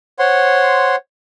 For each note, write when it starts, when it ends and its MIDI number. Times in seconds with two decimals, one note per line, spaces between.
0.19 0.96 72
0.19 0.96 73
0.19 0.96 78
0.19 0.96 84